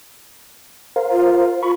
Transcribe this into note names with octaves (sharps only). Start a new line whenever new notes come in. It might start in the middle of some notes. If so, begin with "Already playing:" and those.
A#4 C5 F5
F4
F4 B5 C#6